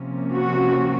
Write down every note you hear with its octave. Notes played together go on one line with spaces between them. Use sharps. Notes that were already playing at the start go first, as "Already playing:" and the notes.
Already playing: C3 F3 A#3 C#4
F#4